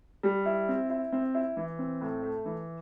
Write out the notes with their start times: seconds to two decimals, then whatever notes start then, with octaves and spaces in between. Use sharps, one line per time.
0.23 G3
0.46 E4
0.68 C4
0.90 E4
1.12 C4
1.35 E4
1.57 E3
1.79 C4
2.01 A2
2.22 A3
2.45 E3